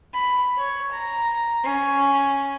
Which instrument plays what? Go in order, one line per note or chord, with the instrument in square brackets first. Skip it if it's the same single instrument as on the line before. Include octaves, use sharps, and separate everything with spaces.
[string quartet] B5
C#5
A#5
C#4